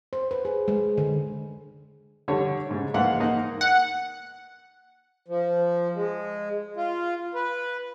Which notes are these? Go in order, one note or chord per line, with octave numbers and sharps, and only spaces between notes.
C5
B4
G#4
G#3
D3
D3 G3 C#5
G#2 C#3
G#2 E3 A#3 F5 F#5
A#3 D#4 D#5 F#5
F#5
F3
G#3
F4
B4